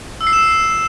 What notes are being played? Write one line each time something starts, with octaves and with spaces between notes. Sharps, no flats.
E6
C7
E7